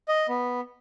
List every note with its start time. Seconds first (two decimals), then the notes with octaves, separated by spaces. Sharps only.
0.08 D#5
0.29 B3